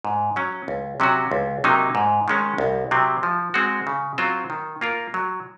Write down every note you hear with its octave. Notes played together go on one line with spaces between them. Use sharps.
G#2
F#3 C#4
C#2
C3 F#3 C#4 F#4
C#2
C3 F#3 A#3 D#4
G#2
D#3 G#3 C#4
C2
C3 F#3 C4
F3
G#3 C4 F#4
C#3
F#3 C4 F4 C5
D#3
A#3 F4 A#4
F#3